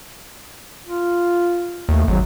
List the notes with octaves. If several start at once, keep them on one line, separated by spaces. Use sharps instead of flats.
F4
D#2 A3
G#1 F#3